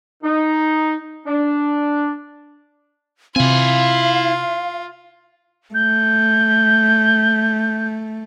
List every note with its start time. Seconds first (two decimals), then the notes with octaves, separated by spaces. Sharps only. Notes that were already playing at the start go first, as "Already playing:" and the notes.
0.24 D#4
1.27 D4
3.36 C3 C4 E4 F4 F5 G#5
5.74 A3 G6